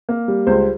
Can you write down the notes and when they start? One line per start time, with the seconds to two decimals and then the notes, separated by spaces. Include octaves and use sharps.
0.09 A#3
0.28 G3
0.47 C#2 C5